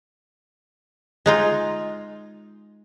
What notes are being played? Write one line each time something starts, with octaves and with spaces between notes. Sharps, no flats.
G#3 D#4 F4